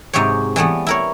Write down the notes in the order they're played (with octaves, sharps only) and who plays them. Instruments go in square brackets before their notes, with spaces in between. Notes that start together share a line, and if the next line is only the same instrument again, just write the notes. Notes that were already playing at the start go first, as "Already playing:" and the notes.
[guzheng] G#2 C3 F#3 G4 C#5
E3 G3 A3 B3
E4 A#4 C#5